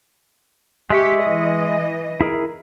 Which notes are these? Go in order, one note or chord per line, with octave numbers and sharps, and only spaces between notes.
G#3 G4 E5 C#6
E3 D#5
E4 G#4 A#4